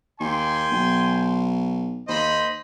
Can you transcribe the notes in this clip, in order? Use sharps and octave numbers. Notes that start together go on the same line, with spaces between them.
D#2 G5 G#5 C6
B1
D#2 C5 D#5 B5